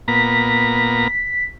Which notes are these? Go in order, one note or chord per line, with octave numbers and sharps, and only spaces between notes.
A#2 B3 A#5 B6